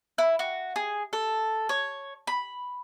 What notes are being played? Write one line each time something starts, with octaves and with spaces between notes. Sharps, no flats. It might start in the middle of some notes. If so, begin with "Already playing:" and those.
E4
F#4
G#4
A4
C#5
B5